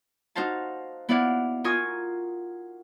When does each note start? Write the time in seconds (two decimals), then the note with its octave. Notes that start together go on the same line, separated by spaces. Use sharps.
0.35 D#4 F#4 C5 F5 A5
1.09 B3 E4 D5 F5 F#5
1.64 F4 A#4 G#5 C#6 D#6